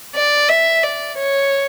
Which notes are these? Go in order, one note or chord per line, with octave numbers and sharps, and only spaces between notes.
D5
E5
D5
C#5